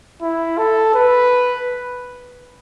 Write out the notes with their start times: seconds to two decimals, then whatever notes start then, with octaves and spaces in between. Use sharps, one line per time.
0.22 E4
0.58 A4
0.94 B4